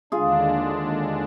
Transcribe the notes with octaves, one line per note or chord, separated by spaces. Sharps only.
D#2 D3 G#3 D4 F4 G#4